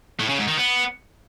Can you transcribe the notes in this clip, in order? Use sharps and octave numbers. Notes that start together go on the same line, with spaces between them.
A2
C#3
G#2
D#3
B3